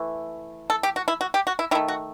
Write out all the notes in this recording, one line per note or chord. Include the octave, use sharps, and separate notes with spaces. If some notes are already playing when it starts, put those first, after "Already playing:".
Already playing: E3 A3
A4
G4
F#4
E4
F#4
G4
F#4
E4
D#3 A3 E4
F#4